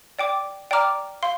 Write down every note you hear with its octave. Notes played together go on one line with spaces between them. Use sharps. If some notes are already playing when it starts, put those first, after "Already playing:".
D5 G5 D6
D5 G5 A#5 D6 F6
F5 C6